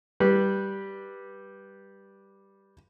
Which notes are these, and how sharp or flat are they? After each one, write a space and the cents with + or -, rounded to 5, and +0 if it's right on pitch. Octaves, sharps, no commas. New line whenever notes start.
G3 +0 B4 -15